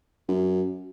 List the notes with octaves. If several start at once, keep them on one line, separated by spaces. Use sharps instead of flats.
F#2